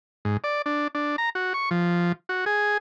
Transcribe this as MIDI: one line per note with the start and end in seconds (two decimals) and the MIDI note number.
0.25 0.37 44
0.44 0.62 74
0.66 0.88 62
0.95 1.16 62
1.18 1.30 82
1.35 1.53 66
1.54 1.69 85
1.71 2.12 53
2.29 2.45 66
2.46 2.77 68